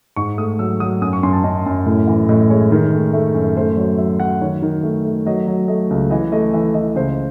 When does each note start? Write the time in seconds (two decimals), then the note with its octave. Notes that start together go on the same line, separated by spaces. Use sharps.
0.16 G#2 C#6
0.38 A3 D#6
0.59 F#3 E6
0.80 F#3 D#6
1.02 F#2 D#6
1.13 C#6
1.23 F#2 C6
1.33 A5
1.44 F#2 D#5
1.66 F#2
1.86 A2
2.08 E3
2.29 A2 D#5
2.50 G#3 C#5
2.72 D#3
2.93 A3
3.13 A3 E5
3.35 F#2
3.56 A3 C5
3.77 F#3 C#5
3.98 F#3 E5
4.20 F#3 F#5
4.41 D#3 C#5
4.62 D#3
4.83 A3
5.05 A3
5.26 F#3 D#5
5.47 F#3
5.68 A3 D#5
5.90 C#2
6.10 E3 D#5
6.32 A3 D#5
6.54 E3 E5
6.74 E3 D#5
6.95 C#2 C5